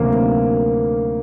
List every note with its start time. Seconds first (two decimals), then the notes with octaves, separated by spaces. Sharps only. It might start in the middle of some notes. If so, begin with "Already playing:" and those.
Already playing: D2 C3 D#3 F#3 A#3